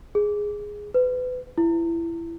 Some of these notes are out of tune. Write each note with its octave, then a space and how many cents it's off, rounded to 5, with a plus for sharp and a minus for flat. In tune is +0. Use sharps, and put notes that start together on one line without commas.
G#4 +0
B4 +30
E4 +20